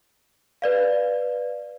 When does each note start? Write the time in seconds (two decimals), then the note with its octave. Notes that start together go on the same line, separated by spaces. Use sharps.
0.62 B4 D5 F5